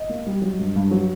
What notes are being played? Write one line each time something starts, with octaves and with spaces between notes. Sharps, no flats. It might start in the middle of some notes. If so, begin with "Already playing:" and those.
Already playing: D#5
A#3
G3
F#3
G2
G2
F#3